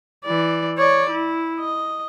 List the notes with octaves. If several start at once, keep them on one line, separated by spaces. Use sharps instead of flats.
E3 D5
C#5 D5
E4
D#5